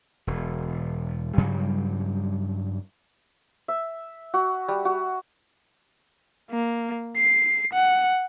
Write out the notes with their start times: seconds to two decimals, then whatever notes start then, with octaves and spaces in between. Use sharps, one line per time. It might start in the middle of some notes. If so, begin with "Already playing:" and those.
0.27 E1
1.37 G2 C#3 F#3 G3
3.68 E5
4.34 F#4
4.68 G3
4.85 F#4
6.51 A#3
7.16 C7
7.73 F#5